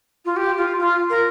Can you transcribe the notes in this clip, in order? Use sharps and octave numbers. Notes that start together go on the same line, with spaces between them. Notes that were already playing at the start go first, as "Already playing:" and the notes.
F4
G4
F4
F4
A#4